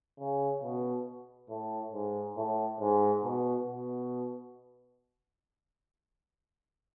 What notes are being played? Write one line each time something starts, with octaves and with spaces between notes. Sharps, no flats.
C#3
B2
A2
G#2
A2
G#2
B2
B2